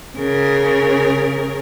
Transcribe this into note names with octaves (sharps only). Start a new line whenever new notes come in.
C#3 A#4